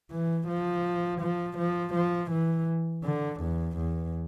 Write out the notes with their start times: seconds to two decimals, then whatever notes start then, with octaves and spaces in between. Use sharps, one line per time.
0.11 E3
0.48 F3
1.21 F3
1.58 F3
1.94 F3
2.31 E3
3.04 D3
3.41 E2
3.77 E2